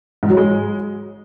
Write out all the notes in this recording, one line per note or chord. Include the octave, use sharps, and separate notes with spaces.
G#2
F#3
G#3